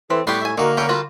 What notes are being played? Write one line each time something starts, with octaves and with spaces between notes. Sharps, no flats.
E3 C4 A4
A2 G3 B3 G4 C6 C#6
E5 G#5
D3 D#3 A#3 F#4 A#4
D3 C#4 E4 G5
G3 F4 F#4